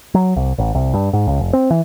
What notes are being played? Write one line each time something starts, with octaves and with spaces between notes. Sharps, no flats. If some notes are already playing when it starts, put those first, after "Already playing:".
F#3
C2
A1
C2
G2
G#2
C#2
F1
C4
E3